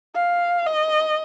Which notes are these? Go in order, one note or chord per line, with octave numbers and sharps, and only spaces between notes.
F5
D#5